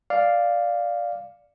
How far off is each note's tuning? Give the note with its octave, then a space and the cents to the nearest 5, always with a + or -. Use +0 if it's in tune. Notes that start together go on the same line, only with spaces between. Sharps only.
D5 +0 F5 +0